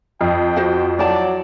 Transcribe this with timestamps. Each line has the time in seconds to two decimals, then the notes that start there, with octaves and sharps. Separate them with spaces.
0.21 F2 G5
0.56 F#4 C5 F#5
0.99 F#3 E4 D5 A5